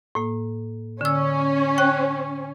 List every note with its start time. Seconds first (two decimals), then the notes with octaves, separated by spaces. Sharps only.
0.15 A2 A#3
1.01 D3 C#4 E6
1.78 G5 F#6